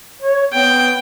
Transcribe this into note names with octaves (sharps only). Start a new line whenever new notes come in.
C#5
B3 G5